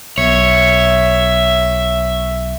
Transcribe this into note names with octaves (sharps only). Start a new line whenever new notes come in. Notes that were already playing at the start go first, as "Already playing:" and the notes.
B1 C#5 E5